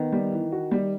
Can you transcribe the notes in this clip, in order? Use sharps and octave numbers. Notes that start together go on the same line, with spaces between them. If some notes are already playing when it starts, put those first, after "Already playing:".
Already playing: D#3 B3
G3
E3
F#4
G3